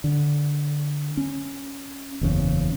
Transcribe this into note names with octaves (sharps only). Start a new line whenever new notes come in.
D3
C#4
F#1 E2 C#3